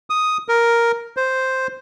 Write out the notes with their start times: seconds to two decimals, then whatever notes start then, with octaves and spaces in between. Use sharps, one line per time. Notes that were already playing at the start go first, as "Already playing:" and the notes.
0.10 D#6
0.48 A#4
1.17 C5